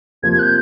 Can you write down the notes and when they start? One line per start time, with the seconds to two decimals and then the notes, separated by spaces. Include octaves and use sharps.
0.22 C3 F3 A#3 G#6
0.33 G#6
0.39 F#6
0.43 G6